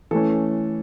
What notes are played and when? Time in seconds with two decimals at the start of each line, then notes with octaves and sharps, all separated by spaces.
0.11 E3 A3 C#4 A4